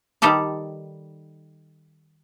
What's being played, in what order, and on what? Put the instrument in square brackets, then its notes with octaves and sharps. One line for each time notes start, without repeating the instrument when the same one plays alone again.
[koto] D#3 G3 G4 A4 D5